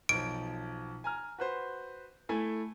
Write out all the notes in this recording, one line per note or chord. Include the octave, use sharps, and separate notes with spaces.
B1 F3 D7
G#5 A#5 F6
F#4 B4 C5
A3 E4 G#5